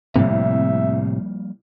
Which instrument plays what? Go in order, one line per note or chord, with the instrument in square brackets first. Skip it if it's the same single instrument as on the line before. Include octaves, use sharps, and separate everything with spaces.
[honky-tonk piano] C2 [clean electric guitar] A2 C3 [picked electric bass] F3 G3 A#3 [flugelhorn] E5